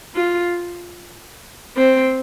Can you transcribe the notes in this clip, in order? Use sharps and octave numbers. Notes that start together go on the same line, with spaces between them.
F4
C4